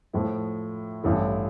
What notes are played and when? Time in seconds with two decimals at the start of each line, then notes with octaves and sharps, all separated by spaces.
0.13 A2 F3 A3 E4
1.03 A1 G2 E3 A3 E4